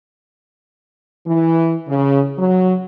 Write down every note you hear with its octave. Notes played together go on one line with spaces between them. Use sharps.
E3
C#3
F#3